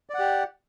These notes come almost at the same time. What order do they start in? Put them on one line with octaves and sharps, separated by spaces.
D5 F#5 G4